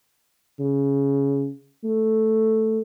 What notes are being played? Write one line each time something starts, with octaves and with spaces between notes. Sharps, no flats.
C#3
A3